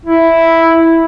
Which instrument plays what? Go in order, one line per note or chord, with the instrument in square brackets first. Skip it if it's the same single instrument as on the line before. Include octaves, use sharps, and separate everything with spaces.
[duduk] E4